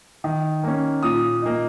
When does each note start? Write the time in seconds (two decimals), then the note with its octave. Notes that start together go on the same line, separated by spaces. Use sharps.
0.24 D#3
0.64 A#3 C#4
1.03 A#2 D#6
1.42 A#3 D#4